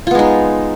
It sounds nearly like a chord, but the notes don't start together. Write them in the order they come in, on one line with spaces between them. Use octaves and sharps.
F4 B3 G#3 D#4